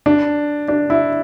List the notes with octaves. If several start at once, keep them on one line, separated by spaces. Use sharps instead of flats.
D4
D4
E4